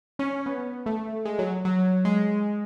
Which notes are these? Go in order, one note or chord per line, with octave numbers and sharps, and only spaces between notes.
C#4
B3
A3
G#3
F#3
F#3
G#3